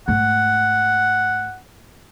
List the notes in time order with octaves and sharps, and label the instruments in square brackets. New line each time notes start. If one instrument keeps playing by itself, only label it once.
[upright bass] G#2 A3 [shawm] F#5